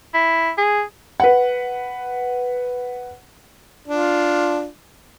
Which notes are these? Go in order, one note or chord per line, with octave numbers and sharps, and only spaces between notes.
E4
G#4
B4 F#5
D4 F4